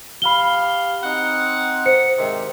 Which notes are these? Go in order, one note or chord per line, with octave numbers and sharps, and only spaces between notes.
G4 F5 B5 G7
C4 D#4 F#5
C5 C#7
G#2 C3 D#3